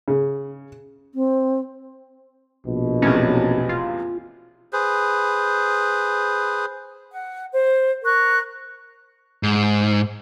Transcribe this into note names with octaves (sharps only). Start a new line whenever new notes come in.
C#3
C4
A#1 B2
E2 A2 C3 C#4
F4
G#4 B4 C5
F#5
C5
A#4 C#6 F#6
G#2